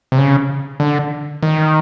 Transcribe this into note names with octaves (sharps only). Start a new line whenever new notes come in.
C3
C#3
D3
D#3